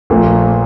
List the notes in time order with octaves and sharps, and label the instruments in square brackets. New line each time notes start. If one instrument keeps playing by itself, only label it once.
[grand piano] A#1 A#2 F3 A#3 [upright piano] A3